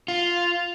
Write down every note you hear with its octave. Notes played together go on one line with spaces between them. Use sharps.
F4